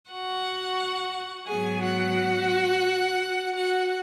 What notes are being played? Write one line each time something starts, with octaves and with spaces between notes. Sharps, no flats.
F#4 F#5
G#2 F#3 B3 G#4 G#5
F#4 F#5
F#4 F#5